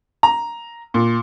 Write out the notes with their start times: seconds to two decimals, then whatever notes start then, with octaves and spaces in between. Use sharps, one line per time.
0.23 A#5
0.94 A#2